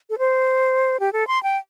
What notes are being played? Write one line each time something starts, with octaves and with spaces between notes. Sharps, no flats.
A4
C5
G4
A4
C6
G5